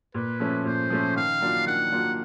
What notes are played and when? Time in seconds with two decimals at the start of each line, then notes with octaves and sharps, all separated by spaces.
0.14 A#2 B4
0.40 F3 A3 C#4
0.65 A#2 C5
0.90 F3 A3 C#4
1.16 D#3 F5
1.41 F#3 A#3 D4 F4
1.66 D#3 F#5
1.92 F#3 A#3 D4 F4